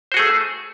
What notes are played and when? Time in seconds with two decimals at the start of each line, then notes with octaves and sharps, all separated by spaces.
0.12 C5
0.14 F#4
0.17 G#4
0.19 A3